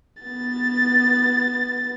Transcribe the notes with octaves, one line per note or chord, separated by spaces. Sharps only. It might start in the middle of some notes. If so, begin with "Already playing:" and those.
B3 A6